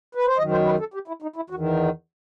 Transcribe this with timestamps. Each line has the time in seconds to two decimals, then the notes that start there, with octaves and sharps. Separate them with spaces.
0.15 B4
0.26 C5
0.37 F#2 D#3 D#5
0.51 C5
0.65 B4
0.79 A4
0.94 G4
1.08 E4
1.22 D#4
1.36 E4
1.50 E2 F#4
1.55 D#3